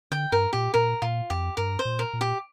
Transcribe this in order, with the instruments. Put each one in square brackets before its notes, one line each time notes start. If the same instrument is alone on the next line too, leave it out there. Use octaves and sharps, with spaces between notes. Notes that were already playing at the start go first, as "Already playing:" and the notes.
[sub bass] D3 [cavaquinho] G5
[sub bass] G2 [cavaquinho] A#4
[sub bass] A#2 [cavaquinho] G4
[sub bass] A#2 [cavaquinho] A#4
[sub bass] A#2 [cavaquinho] F4
[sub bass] F2 [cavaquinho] G4
[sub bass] G2 [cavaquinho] A#4
[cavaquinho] C5
[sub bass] A#2
[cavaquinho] A#4
[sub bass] A#2
[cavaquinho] G4